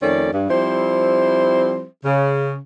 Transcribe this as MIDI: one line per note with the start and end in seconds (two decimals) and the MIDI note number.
0.02 0.30 41
0.02 0.30 51
0.02 0.30 57
0.02 0.30 61
0.02 0.30 74
0.33 0.49 43
0.50 1.85 53
0.50 1.85 55
0.50 1.85 60
0.50 1.85 64
0.50 1.85 72
2.05 2.58 49